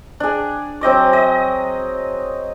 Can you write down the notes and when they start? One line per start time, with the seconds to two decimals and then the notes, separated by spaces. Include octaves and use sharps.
0.20 D4 G#4
0.81 F#3 C4 D#5 D6
1.13 D#5